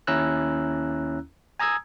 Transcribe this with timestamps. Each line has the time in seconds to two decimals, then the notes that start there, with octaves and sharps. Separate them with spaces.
0.07 D#2 C#4 E4 A#5 E6 F#6
1.60 G#5 A#5 D#6 E6 G#6